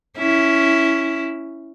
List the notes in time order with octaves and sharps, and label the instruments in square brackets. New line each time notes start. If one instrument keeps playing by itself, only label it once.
[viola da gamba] C#4 E4